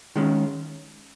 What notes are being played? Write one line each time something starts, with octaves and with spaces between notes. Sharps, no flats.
D#3 G#3 C#4